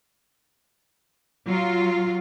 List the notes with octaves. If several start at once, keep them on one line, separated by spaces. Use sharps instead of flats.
F#3 F4